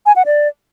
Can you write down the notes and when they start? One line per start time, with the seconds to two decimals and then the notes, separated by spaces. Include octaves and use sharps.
0.06 G#5
0.16 F#5
0.26 D5